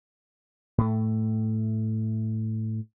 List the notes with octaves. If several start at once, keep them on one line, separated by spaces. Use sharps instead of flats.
A2 A3